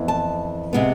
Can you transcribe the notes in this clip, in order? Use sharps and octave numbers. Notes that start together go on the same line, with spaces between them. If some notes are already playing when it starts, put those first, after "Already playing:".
Already playing: F2 E3 B3
A5
C3 G#3 B3